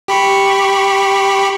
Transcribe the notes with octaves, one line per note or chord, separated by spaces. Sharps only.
G4 B5 C#6